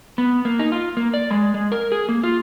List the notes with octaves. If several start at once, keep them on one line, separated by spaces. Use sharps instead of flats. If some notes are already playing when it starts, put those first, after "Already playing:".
B3
A#3
D#4
F4
A#3
D5
G#3
G#3
A#4
G#4
A#3
F4